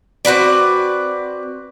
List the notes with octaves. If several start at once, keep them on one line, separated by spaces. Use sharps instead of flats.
C4 F#4 B4 D5